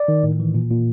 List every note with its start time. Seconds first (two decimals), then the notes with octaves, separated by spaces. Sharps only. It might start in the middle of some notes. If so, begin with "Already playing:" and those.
Already playing: D5
0.08 D#3
0.23 A2
0.40 E3
0.54 A#2
0.71 A#2